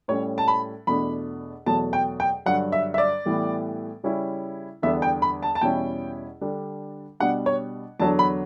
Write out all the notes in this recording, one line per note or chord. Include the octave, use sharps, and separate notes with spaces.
A2 G3 C#4 C#5
A5
B5
E2 B2 A3 D4 B5
E2 B2 F#3 A3 A5
G5
G5
G2 D3 F#3 F#5
E5
E5
D5
A2 E3 G3 B3
C#3 G3 C#4 E4
E2 D3 G3 B3 D4 E5
G5
B5
A5
A5
E2 B2 G3 C#4 E4 G5
D3 G3 D4
B2 G3 D4 F#5
C#5
E2 D3 F#3 B3 D4 A5
B5